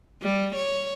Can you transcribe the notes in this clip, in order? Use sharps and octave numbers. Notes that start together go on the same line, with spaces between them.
G3
C#5